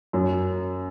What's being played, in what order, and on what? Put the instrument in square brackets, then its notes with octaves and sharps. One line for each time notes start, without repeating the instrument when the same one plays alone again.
[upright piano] F#2